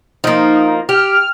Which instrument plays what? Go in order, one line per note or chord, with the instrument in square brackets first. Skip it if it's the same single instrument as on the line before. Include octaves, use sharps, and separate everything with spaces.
[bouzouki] F3 A#3 [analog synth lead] D#4
[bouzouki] G4 [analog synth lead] F6